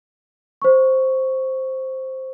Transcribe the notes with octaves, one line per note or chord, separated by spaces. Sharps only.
C5 C#6